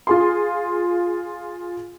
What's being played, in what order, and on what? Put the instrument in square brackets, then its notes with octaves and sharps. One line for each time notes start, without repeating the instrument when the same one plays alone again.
[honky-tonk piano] F4 G#4 C6